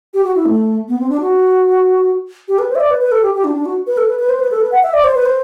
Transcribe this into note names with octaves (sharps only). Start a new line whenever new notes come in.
G4
F#4
E4
A3
B3
C4
D4
F#4
G4
B4
C5
E5
D5
B4
B4
A4
G4
G4
D4
D4
F#4
B4
A4
B4
B4
C5
B4
A4
B4
F#5
E5
D5
C5
B4
C5